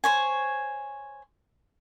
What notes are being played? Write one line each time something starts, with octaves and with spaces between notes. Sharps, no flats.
C5 C#5 G#5